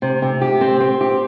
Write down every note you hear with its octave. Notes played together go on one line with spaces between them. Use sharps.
C3
C3
G4
C4
C4
G4